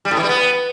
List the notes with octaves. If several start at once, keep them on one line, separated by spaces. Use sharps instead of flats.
G3
A2
E3
G3
B3